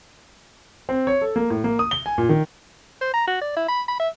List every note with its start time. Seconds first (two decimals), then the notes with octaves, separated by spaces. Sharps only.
0.89 C4
1.07 C#5
1.21 A4
1.36 A#3
1.50 A2
1.64 A#3
1.79 D#6
1.91 G7
2.06 G#5
2.18 A#2
2.29 D#3
3.01 C5
3.14 A#5
3.27 F#4
3.41 D5
3.56 E4
3.68 B5
3.88 B5
3.99 E5